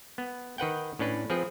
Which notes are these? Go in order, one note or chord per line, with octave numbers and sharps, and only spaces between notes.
B3
D#3 B4 F#5 G5
A2 C#4 D4 B4
F3 C4 G#4 B4